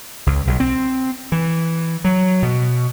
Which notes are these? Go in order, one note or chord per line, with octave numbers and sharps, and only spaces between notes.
C#2
B1
C4
E3
F#3
B2